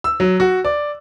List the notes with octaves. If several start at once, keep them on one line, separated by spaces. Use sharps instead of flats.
E6
F#3
F#4
D5